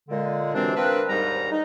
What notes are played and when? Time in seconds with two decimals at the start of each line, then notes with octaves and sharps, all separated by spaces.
0.08 A#2 D3 G#3
0.54 F#2 C3 E3 C4 D4
0.75 A#3 C4 D4 A#4 B4
1.09 D#2 G#2 G3 D#4 A#4 A#5
1.51 D#4